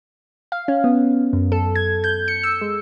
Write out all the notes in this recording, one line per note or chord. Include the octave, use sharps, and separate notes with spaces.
F5
C#4
B3
F#2
A4
G#6
G6
C#7
E6
G#3